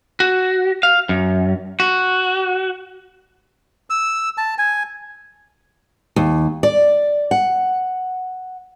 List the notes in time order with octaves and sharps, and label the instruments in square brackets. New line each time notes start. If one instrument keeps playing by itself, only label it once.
[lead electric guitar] F#4
F5
F#2
F#4
[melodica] E6
A5
G#5
[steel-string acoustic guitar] D#2
D5
F#5